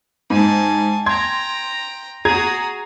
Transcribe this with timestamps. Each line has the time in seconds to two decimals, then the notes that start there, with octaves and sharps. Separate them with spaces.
0.30 G#2 G#5 A5
1.06 G5 A#5 C6 G#6
2.25 F#4 G#4 A#5 D#6 G#6